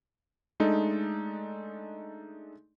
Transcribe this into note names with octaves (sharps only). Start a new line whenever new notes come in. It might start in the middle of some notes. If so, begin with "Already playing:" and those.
G#3 A3 D4 D#4 A4